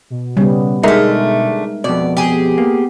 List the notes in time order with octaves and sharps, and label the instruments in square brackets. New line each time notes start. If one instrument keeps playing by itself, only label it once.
[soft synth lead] B2
[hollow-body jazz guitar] C#3 [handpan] G3 B3
[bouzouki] D3 A3 [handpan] G#3 A#4 E5 [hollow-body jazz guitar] D#4 G#4 A#5
[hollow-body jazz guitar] F2 B2 [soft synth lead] B3 [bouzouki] D5
[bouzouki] G4 G#4
[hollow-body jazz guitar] A#3